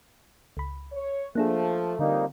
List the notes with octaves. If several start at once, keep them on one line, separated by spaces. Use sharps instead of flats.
C#2 B5
C#5
F3 A3 A#3 D4 G#4
F2 D3 G3 A#3 C4 D#4